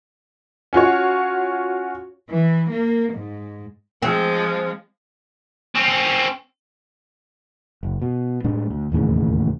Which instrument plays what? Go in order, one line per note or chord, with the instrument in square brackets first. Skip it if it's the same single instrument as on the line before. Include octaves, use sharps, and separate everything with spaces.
[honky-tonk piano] C#4 F4 F#4 C#5
[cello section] E3
A#3
G#2
[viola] F3 G#3 [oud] C4
[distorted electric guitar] C4 C#4
[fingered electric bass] F#1
B2
A2 G#3 D4
D2
E1 D#2 A2 C#3